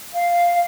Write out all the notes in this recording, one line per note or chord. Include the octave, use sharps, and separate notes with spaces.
F5